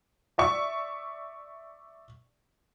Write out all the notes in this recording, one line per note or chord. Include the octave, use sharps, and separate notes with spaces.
D5 E5 C#6